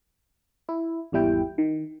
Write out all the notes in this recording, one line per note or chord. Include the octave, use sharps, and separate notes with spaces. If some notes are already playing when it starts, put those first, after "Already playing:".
E4
G#1 E2 G3 E4 G5
D#3